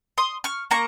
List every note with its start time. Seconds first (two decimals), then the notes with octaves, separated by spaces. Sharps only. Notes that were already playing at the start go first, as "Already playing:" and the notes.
0.18 C6 D#6
0.44 C#6 F6
0.71 A#3 A#5 C#6